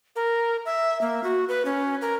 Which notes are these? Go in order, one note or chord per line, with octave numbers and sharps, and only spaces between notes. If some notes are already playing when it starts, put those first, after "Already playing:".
A#4
E5
A#3
F#4
B4
C#4
A#4